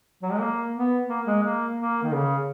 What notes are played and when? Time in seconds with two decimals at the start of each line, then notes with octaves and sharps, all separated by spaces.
0.22 F#3
0.31 G#3
0.40 A#3
0.74 B3
1.08 A#3
1.26 G#3
1.43 A#3
1.77 A#3
2.03 D#3
2.12 C#3